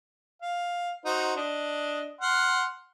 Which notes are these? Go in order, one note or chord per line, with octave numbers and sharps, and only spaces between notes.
F5
D#4 F#4 C5
D4 D#5
F#5 C6 F6